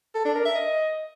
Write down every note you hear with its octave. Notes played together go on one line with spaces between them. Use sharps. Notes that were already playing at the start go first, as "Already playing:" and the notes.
A4
D4
A#4
E5
D#5